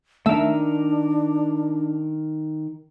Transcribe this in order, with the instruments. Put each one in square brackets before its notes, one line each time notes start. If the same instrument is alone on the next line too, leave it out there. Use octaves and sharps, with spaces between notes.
[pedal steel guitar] D#3 A#4 [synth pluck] A3 E5 [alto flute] D4